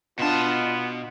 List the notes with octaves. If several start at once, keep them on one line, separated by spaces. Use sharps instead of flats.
B2 B3 D4 F4 A5 E7